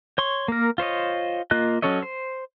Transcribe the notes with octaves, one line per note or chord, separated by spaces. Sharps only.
C#5 C6 C#6
A#3 A#4
F4 C5 C#5 D#5
A#3 F4 D#5 F#6
F#3 C#4 A4 C#5 D#5
C5